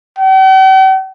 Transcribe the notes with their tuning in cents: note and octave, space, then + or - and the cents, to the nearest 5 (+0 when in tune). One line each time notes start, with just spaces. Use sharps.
G5 -45